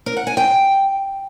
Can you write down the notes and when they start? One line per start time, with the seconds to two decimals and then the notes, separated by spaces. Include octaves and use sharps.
0.06 A#4
0.17 F#5
0.27 G#5
0.37 G5